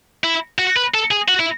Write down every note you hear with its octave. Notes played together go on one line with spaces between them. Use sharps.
E4
F#4
B4
A4
G#4
F#4
E4